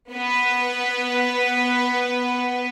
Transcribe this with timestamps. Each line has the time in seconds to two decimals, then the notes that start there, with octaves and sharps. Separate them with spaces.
0.11 B3 B4